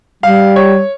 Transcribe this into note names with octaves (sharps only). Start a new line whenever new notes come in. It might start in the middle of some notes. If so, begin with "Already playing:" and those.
G3 F5
C#5